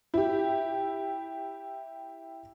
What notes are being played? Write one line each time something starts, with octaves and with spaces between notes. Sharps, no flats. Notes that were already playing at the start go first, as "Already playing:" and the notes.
E4 G4